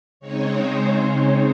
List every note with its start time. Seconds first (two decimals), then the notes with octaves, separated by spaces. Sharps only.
0.20 C#3 G#3 C4 D#4 C#5
0.49 C5